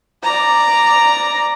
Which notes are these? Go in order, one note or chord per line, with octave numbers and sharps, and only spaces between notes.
D5 A#5